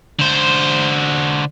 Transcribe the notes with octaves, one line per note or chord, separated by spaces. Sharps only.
D3 C5